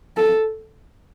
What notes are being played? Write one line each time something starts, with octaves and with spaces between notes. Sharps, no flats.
A4